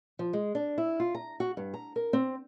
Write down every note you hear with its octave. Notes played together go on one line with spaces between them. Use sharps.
F3
G#3
D4
E4
F4
A#5
F#4
G2
A#5
A#4
C4